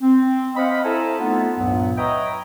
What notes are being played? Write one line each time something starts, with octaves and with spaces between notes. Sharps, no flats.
C4
C5 D#5 F5 F#5 B5
E4 A4 C5 E5 G#5 A#5
A3 B3 D#4 F4
C#2 G2 A#2 F#3 B3
B4 C#5 D#5 E5 G5 A#5